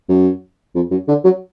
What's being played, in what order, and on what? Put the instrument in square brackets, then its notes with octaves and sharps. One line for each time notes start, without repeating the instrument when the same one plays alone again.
[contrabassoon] F#2
F2
F#2
D3
F#3